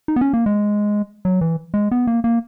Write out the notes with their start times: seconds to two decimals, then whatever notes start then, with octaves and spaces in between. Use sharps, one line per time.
0.08 D#4
0.16 B3
0.21 C#4
0.33 A#3
0.46 G#3
1.25 F#3
1.41 E3
1.74 G#3
1.91 B3
2.07 A#3
2.24 A#3